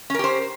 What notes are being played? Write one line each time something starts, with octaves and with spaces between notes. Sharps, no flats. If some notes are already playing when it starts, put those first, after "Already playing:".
C#4 G4 A#4 C5